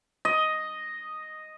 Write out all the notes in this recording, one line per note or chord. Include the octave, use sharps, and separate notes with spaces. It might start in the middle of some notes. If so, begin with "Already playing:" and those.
D#5